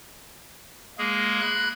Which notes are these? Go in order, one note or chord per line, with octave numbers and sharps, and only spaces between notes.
G#3 A#3 G#4
B5 F#6